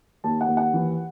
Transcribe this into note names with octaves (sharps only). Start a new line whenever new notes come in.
D#2 A5
F#5
D#2
F#5
E3